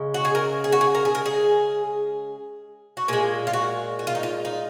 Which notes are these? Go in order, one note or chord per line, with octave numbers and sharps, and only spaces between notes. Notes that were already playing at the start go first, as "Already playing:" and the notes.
Already playing: C#3 G#3
F#4
G#4
A#4
G#4
F#4
G#4
A#4
G#4
A#4
G#4
F#4
A#2 G#3 G#4
F4
F#4
F#4
F4
D#4
F4
D#4